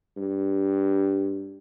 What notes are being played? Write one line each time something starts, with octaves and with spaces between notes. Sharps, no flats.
G2